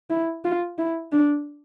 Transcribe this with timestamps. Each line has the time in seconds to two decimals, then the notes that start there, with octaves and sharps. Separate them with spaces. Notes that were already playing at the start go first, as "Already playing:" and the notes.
0.10 E4
0.44 F4
0.78 E4
1.12 D4